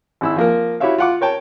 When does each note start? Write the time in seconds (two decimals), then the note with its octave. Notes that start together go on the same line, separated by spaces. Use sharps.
0.21 G#1 E4 E6
0.36 F3 A#3 A#4
0.80 E4 F#4 G4 C#5 E5 F5
0.98 F4 F#5 D6
1.21 A#4 C#5 G5 A5